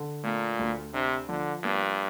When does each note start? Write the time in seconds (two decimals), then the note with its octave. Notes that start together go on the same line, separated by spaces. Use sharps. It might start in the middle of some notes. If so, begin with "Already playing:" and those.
Already playing: D3
0.23 A#2 A3
0.59 D2
0.93 C3 D4
1.28 D3 F3
1.63 G2 A#3